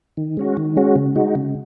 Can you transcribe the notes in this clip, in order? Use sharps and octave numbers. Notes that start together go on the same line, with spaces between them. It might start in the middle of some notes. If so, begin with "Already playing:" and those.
D#3
G#3 C#4 F#4
D#3
G#3 C#4 F#4
C#3
G#3 D#4 F#4
C#3